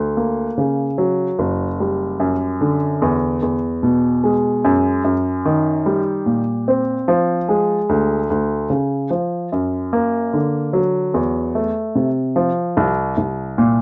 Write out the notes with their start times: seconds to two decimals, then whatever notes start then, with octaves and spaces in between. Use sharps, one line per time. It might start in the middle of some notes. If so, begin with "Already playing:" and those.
Already playing: D2
0.17 A#3
0.58 C#3
0.98 F#3
1.39 F#1
1.80 G3
2.20 F#2
2.61 D3
3.02 E2
3.42 E2
3.83 B2
4.24 G#3
4.64 F#2
5.04 F#2
5.45 D#3
5.86 G3
6.26 A#2
6.68 C4
7.08 F3
7.49 G#3
7.89 D2
8.30 D2
8.70 C#3
9.10 F3
9.52 F#2
9.93 A#3
10.33 D3
10.73 F#3
11.14 E2
11.55 A3
11.95 C3
12.36 F3
12.77 C2
13.17 C2
13.58 A#2